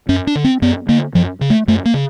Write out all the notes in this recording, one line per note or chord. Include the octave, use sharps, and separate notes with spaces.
F#2 C#4
D4
D3
C4
F#2 B3
D3 A#3
F#2 F3
C#3
A3
F#2 A3
A#3
C#3